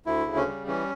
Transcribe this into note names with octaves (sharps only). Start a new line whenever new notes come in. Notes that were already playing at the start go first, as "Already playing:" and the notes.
D2 E4
C#3
C#4
G3
E3 C#4